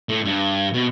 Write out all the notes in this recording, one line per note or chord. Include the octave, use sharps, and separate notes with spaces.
A2
G2
B2